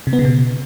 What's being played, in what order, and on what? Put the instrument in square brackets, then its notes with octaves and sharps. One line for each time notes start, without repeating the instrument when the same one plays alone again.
[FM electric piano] C3
B3
C#3
B2